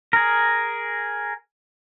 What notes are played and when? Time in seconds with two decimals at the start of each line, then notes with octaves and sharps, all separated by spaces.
0.13 G#4 A#4